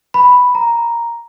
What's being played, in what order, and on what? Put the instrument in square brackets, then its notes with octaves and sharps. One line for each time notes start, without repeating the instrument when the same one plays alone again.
[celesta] B5
A#5